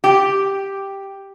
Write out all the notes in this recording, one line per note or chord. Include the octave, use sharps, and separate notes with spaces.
G4